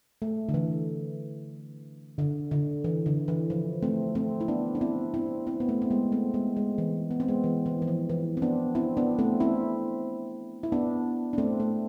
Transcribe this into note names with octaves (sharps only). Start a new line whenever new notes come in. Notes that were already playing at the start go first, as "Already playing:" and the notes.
A3
D3
E3
D3
D3
E3
D3
E3
F3
A3 C4
A3 C4
E4
B3 D4
D4
C4 E4
C4 E4
C4 E4
B3
A3 C4
C4
G#3 B3
A3 C4
G#3 B3
G#3
E3
B3
C4
G#3 B3
E3
E3
E3
F3
E3
C4
B3 D4
C4 E4
B3 D4
A3 C4
C4 E4
E4
B3 D4
D4
A3 C4
A3